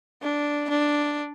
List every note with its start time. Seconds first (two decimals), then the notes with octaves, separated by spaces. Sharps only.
0.23 D4
0.70 D4